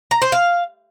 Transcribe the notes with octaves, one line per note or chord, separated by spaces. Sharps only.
A#5
C5
F5